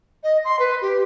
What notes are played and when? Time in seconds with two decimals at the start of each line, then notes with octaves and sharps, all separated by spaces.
0.24 D#5
0.45 C6
0.59 B4
0.82 G4